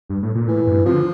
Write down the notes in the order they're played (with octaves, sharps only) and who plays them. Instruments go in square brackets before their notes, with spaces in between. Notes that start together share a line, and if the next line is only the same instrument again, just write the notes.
[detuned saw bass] G2
A2
A#2
[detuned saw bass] A2 [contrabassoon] E3
[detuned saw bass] G2
[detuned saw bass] C3 [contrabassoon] F3
[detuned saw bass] D3